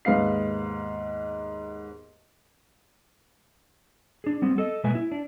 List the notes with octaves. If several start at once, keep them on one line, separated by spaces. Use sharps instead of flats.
D#2 G#2 B3 F5 C7
D4 G#4
G3 B3 C4
A4 D#5
B2 G#3 A#3 B4 E5 G#5
E4
D4